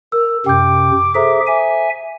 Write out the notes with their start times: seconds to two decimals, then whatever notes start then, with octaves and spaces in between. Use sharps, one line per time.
0.12 A#4 E6
0.46 F#2 C3 G5 D6 G6
1.15 G#4 A4 C5 E5 A#5
1.47 E5 G#5